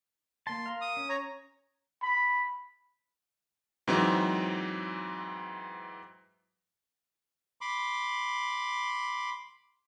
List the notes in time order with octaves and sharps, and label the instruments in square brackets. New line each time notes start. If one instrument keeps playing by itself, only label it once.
[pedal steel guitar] A#3 A5 [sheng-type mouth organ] C6
[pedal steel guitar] A#4 F5
[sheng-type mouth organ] D#6
[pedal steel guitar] C#4
[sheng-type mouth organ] C#5 A#5
[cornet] B5
[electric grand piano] G#2 E3 F#3 C4 D#4
[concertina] B5 C6 D6